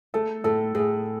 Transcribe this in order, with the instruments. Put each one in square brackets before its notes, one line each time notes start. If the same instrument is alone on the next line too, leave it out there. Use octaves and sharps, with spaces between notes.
[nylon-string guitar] A3 [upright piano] A4
[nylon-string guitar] A2 [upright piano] A4
[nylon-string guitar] A2 [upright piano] G#4